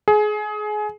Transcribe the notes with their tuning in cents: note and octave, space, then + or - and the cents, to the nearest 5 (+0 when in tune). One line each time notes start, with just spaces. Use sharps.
G#4 +25